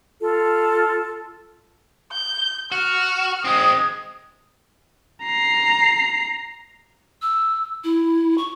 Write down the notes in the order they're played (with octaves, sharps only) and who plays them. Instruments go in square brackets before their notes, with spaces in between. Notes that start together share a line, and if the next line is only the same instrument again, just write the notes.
[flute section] F4 A4
[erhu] G6
[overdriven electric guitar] F#4 [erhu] F6
[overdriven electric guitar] G#3 C4 [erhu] D#6
[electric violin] A#5 C7
[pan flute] E6
E4
C#6